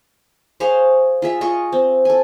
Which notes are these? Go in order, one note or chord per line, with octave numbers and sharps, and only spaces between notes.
G#4 C5 C#5 F5
F4 G#4 E5
F4 G#4 D#5 C#6
C4
A4 G#5